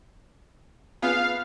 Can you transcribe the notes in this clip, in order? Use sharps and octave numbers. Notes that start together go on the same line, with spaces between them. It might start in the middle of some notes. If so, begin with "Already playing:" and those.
B3 F4 G#4 F5